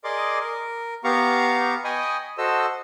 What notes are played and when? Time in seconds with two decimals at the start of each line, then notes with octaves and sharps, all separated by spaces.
0.04 G#4 A#4 D5 D#5 C6 D6
0.40 A#4
1.04 B3 G4 F5 A#5 C#6
1.84 D#5 G5 G#5 B5 C#6 D#6
2.38 F#4 A4 C5 D#5 E6